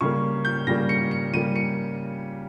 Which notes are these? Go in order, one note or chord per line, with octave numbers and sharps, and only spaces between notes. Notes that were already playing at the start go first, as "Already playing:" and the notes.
C#3 G3 A#3 C#6
G6
C#3 G3 A#3 A#6
C#7
C#7
C#3 G3 A#3 D#7
C#7